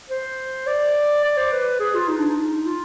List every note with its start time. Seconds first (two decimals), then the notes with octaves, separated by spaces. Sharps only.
0.10 C5
0.67 D5
1.24 D5
1.37 C5
1.51 B4
1.80 G#4
1.95 F4
2.09 D#4
2.18 D4
2.28 D#4
2.54 D#4
2.66 F4